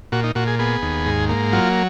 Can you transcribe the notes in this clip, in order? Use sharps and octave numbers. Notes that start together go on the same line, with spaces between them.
A#2 F#4
D#4
A#2 F#4
G#4
B3 G#4
D#2
G#2
A#3
F#3 F4